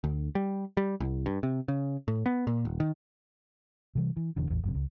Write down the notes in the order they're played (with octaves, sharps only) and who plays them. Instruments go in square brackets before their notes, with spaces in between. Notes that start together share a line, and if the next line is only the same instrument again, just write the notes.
[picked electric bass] D2
G3
G3
C2
G2
C3
C#3
A2
B3
A#2
D#1
D#3
[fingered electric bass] C3 E3 G3
E3
E1 E2 D3
A1 E2
G1 F#2 C3
C#2